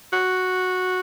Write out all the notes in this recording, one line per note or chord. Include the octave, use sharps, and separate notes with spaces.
F#4